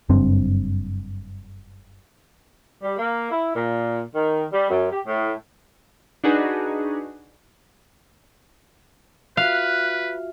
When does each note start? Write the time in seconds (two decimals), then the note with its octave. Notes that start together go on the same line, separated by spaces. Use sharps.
0.10 F#1 G2 C4
2.83 G3
2.98 A#3
3.31 E4
3.55 A#2
4.14 D#3
4.52 G3
4.69 F#2
4.91 G4
5.06 A2
6.24 D4 D#4 F#4 G#4 B4
9.37 F4 F#4 B4 E5 F5 F#6